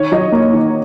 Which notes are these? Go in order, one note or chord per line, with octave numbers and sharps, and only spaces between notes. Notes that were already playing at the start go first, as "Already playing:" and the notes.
Already playing: D#3 C#5
F#3 D#5
A#3
D#3